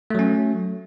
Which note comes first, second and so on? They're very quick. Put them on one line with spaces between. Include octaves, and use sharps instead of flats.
A3 F#3 C#4